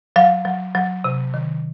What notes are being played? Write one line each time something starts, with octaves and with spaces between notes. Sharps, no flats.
F#3 F5
F#3
F#3
C3
D#3